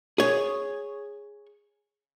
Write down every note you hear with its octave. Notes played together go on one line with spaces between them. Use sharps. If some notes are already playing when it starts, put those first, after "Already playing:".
G#4 C#5